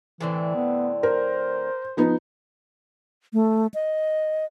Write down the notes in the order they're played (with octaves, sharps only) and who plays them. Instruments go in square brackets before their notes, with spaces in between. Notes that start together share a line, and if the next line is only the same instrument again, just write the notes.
[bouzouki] A2 D3 C4 [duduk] E3
[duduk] B3
[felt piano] A#4 [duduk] C5
[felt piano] F3 B3 D#4
[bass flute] A3
D#5